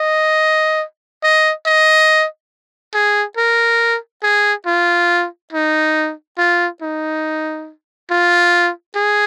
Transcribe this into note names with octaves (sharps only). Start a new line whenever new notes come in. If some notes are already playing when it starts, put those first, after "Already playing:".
Already playing: D#5
D#5
D#5
G#4
A#4
G#4
F4
D#4
F4
D#4
F4
G#4